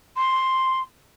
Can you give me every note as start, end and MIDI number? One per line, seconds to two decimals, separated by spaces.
0.17 0.80 84